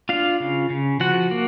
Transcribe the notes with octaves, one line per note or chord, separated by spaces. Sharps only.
D4 F4 F5
C#3
C#3
F3 F#4 F#5
A#3